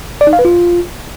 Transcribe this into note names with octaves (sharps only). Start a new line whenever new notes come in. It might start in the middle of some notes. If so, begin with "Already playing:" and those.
D5
D#4
F5
B4
F4